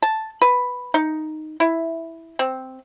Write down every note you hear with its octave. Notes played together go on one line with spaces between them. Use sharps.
A5
B4
D#4
E4
C4